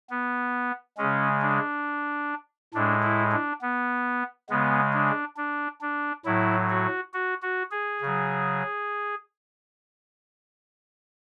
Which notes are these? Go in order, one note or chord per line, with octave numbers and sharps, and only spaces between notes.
B3
C#3 G#3 C#4
D4
A2 G#3 D4
E4
D4
B3
C#3 G#3 B3
D4
D4
D4
A2 F#3 E4
F#4
F#4
F#4
G#4
C#3 F#3